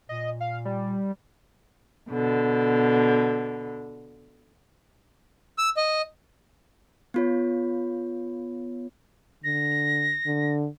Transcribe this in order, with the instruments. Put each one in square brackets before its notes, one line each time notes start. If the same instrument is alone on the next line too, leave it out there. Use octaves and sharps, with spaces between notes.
[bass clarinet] A#2 [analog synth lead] D#5
[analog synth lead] F5
G3
[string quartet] B2 D3
[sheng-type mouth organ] E6
D#5
[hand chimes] B3 F4 C#5
[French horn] D3 [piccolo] A#6
[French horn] D3